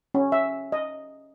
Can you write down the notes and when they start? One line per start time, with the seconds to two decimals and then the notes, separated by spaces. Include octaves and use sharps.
0.14 C#4
0.32 E5
0.72 D#5